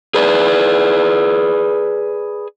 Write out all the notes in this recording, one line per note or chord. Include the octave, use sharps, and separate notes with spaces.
G#4 B4 D5